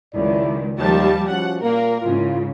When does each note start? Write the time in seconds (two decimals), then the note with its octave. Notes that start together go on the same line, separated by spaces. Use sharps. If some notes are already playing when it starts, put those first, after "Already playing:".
0.14 C#2 F#2 D#3 E4 D5
0.78 D#2 F3 G3 A5
1.28 F3 C#4 F#4 F#5
1.62 A#2 A#3 A#4
2.03 G#2 C#3 E4 F4